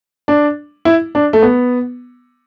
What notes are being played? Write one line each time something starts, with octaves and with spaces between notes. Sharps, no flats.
D4
E4
D4
A3
B3